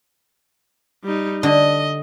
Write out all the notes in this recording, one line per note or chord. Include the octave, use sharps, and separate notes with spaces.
G3 D#4
D3 D#5